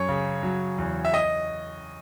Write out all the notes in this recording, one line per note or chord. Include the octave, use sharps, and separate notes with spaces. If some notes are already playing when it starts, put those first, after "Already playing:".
Already playing: F#2 C#5
C#3
F#3
E2
E5
D#5